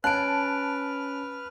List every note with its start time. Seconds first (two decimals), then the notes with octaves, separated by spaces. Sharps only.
0.04 C#4 B4 A5 F6 F#6 D7